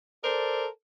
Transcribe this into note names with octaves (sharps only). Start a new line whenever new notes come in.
A4 A#4 C5 D5